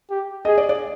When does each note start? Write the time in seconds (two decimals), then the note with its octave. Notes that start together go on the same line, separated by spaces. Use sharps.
0.10 G4
0.45 G#4 D#5
0.58 D5
0.69 D5